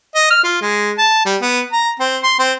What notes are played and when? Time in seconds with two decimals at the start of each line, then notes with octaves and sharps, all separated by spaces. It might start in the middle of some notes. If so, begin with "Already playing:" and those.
0.15 D#5
0.31 F6
0.44 F4
0.61 G#3
0.98 A5
1.25 G3
1.42 B3
1.73 A#5
2.00 C4
2.23 C6
2.39 C4